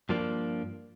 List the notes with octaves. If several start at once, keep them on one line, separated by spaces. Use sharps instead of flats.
G2 F3 A#3 D4